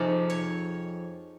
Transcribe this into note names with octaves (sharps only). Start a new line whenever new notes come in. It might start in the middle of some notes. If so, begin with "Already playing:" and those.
Already playing: F2 C3 F3 D#4 G#4
C#5